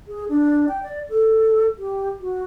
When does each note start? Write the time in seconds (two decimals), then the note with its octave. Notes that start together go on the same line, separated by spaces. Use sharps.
0.08 G#4
0.29 D4
0.68 G5
0.83 D5
1.10 A4
1.79 G4
2.21 F#4